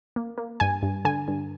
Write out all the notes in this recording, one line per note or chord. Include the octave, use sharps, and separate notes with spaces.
A#3
A#3
G2 G#5
G2
D3 G#5
G2